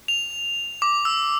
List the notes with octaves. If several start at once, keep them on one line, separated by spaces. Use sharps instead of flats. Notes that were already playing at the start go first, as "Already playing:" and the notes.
F7
D6
E6